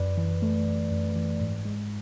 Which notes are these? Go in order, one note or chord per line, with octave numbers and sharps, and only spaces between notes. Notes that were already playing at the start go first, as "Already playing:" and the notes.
Already playing: F#2 B4 D5
E3
A3
F#2
F#2
E3
G#2
G#3